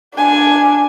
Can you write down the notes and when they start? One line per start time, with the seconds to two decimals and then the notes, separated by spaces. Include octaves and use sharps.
0.15 D4 G#5